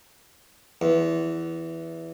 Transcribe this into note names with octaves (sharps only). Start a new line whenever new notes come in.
E2